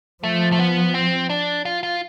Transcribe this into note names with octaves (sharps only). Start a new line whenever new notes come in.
F3 A3
A3
B3
C4
D4
F4
F4